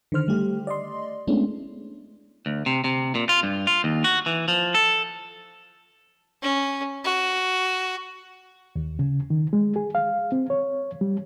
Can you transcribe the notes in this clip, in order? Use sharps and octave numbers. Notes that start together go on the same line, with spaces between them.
D3 D#3 C5 F6
G3 A3 G4
D5 D#5 C6
G#3 A3 B3 C#4 D4 E4
D2
C3
C3
A#2
F4
G2
F4
D#2
F#4
E3
F3
A4
C#4
F#4
D#2
C#3
D#3
G#3
G#4
F5
C4
C#5
G3